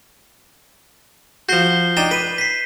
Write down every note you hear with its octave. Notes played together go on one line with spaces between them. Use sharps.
F3 F#4 G6 C7 G7
D4 D#4 G5 E7
B4 D#7
B6 C7